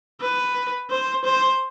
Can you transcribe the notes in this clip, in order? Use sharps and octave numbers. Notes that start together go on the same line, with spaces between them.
B4
C5
C5